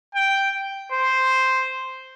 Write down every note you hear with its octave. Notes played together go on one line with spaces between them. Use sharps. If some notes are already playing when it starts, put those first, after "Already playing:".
G5
C5